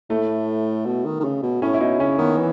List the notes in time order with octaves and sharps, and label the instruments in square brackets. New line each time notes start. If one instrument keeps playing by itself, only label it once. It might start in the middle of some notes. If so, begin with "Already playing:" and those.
[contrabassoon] A2 [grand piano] A3
[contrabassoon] B2
D#3
D#3
C#3
B2
[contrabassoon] A2 [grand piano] C#4
[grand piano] E4
[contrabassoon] B2 [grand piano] D#4
[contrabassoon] C#3 [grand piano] C#4
[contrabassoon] D#3 [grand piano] B3
[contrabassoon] E3